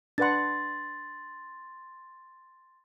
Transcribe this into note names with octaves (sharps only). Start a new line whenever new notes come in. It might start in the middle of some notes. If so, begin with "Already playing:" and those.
D4 B4 F#5 C6 A6